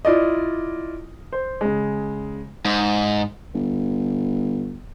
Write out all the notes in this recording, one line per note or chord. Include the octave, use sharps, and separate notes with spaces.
E4 F4 D5 D#5
C5
C#3 G#3
G#2
G1